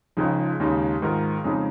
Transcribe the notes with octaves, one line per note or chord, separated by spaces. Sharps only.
C#2 C#3 F3 G#3 D#4
D#2 C#3 G#3 D#4
G#2 D#3 G#3 F4 A#4
F2 C#3 G#3 D#4 G#4